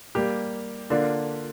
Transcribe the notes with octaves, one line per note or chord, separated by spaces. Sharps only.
G3 A#3 G4
D3 A#3 D4 F4